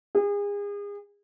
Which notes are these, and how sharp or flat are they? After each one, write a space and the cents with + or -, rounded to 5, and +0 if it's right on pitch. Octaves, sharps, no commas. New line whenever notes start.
G#4 -35